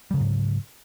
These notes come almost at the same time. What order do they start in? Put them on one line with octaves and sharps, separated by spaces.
G3 C#3 F#3 G#2